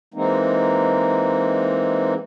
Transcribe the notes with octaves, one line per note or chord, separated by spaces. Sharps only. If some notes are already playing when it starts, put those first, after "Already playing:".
E3 G#3 A#3 C4 D#4